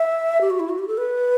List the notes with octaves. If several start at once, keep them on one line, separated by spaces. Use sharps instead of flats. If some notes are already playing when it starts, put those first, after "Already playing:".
Already playing: E5
G4
F#4
E4
F#4
G4
A4
B4